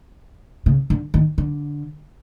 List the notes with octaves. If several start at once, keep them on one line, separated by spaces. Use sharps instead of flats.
C#3
D3
D#3
D3